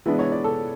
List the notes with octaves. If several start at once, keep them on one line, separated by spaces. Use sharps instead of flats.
E3 G#3 B3 D4 E4
C#5
D5
A4